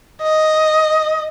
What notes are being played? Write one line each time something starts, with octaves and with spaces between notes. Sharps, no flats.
D#5